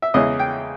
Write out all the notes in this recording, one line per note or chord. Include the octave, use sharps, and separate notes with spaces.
E5
E2 C#3 G#3 C#4 E4 D#5
G5